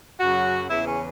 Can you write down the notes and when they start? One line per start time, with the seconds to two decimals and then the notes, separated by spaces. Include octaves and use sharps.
0.20 F#2 C#3 F#3 F#4
0.70 E2 C#3 E3 E4
0.87 C#4